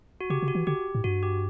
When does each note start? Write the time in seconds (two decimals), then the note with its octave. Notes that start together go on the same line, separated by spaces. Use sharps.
0.21 F#4
0.30 C#3 G4
0.42 C#3
0.48 F#4
0.55 E3
0.67 D3 G4
0.95 A2
1.04 G2 F#4
1.23 G4